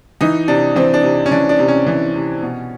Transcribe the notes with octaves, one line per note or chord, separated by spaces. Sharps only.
E3 D#4
C3 D4
E3 C4
D4
C3
C#4
E3 D4
D4
C3
C#4
E3
C3
B2